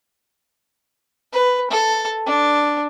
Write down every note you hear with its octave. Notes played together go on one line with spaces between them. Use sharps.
B4
A4
D4